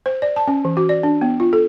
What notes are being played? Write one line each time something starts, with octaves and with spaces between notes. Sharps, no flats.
C5
D5
A5
C#4
E3
F#4
D5
D4
B3
F4
A4